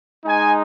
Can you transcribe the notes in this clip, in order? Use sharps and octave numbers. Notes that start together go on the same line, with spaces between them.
G#3 D#4 G#5